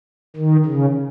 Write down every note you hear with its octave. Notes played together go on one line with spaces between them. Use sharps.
D#3
C#3